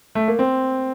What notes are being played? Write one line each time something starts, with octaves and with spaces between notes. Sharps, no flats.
A3
A#3
C4